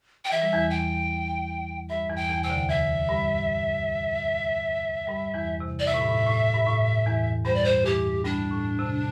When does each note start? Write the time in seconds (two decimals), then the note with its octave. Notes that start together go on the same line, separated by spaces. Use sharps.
0.25 G5
0.31 E3 E5
0.42 G3
0.53 E2 E3
0.70 G5
1.89 G2 G3 E5
2.10 E2 E3
2.16 G5
2.29 E2 E3
2.43 C3 G5
2.50 D2 D3
2.69 E2 E3 E5
3.09 G2 G3
5.08 G2 G3
5.34 E2 E3
5.60 C3
5.79 D5
5.86 C3 E5
5.94 A2
6.02 G2
6.09 A2
6.27 A2
6.54 G2
6.66 A2
7.06 E2 E3
7.45 G2 G3 C5
7.55 D5
7.64 C5
7.85 E2 E3 G4
8.24 G2 G3 D4
8.51 A2
8.79 C3